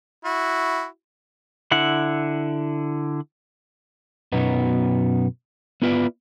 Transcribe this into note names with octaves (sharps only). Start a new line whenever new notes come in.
E4 F#4
D3 E4 F#5
F#2 B2 F#3 B3 D#4
B3 E4 F4 B4 C5 D5